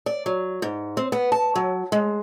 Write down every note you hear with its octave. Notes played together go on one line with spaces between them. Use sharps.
D5
F#3
G#2
C4
B3
A5
F#3
G#3